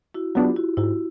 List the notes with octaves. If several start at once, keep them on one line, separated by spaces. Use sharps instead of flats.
E4 F#4
F#3 B3 D4 F4 G4
E4 F#4
G#2 E4 F#4